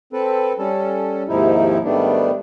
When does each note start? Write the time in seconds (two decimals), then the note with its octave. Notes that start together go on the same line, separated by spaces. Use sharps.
0.13 C4 A4 B4
0.59 G3 C#4 A4
1.29 D#2 G#2 C3 F3 D#4 E4
1.84 G#2 D#3 G3 A3 B3 D4